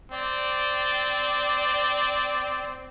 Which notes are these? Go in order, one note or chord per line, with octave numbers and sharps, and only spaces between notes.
C4 D5